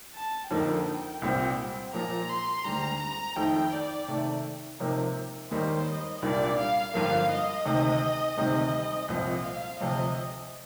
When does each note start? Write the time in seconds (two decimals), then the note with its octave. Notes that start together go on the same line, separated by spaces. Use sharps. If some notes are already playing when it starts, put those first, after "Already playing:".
0.14 A5
0.50 F2 D3 F3 A#3 D#4 G5
1.22 C2 A#2 G3 C4
1.93 A#2 F3 A#3 A#5
2.29 C6
2.64 D2 D3 G3 A#5
3.00 A#5
3.36 F2 D#3 A3 D#4 G5
3.73 D5
4.08 C3 D#3 A3
4.80 C3 F3 A#3 D#4
5.50 D#2 D#3 G3 A#3 D#4 C5
5.86 D#5
6.22 C2 A#2 G3 A#3 D4 D5
6.59 F5
6.94 G2 D3 F3 A#3 F5
7.30 D#5
7.65 D2 C3 D#3
8.37 D2 C3 D#3 G3 C4
9.08 C2 A#2 F3 C4 D#5
9.44 F5
9.80 D2 C3 F3 D#5